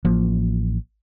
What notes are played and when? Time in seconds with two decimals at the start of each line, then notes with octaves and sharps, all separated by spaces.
0.05 A1 F3 A#3